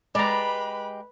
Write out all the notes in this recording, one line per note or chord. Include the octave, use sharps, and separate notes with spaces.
G#3 G4 B4 D5 A#5 B5